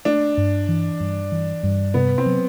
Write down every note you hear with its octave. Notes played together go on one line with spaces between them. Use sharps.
A3 D4
G2
E3
G2
E3
G2
C3 B3
C4
F#3